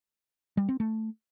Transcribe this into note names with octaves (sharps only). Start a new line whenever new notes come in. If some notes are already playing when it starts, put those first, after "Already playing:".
G3
C4
A3